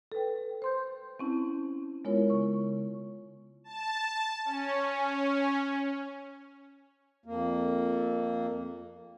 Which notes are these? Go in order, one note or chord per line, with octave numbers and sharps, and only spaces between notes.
A4 B4 G5
C5 C6 G6
C4 C#4 E4 A5
G#3 B3 E4 F4 A#4 C#5
C#3 C#6
A5
C#4
F2 A#3